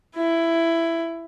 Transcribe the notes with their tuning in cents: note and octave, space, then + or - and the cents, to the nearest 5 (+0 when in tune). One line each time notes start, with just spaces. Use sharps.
E4 +10